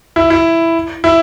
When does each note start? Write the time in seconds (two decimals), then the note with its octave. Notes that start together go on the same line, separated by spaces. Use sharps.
0.16 E4
0.30 E4
1.04 E4